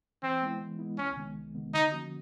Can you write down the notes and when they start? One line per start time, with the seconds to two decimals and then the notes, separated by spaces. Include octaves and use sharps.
0.23 E3 C4
0.42 G#3 B3 E4
0.61 E3
0.79 G#3 B3 E4
0.98 C2 C#4
1.16 C3 D#3 G#3 B3
1.35 C2
1.55 C3 D#3 G#3 B3
1.74 D3 D#4
1.92 F3 A#3 C#4 F#4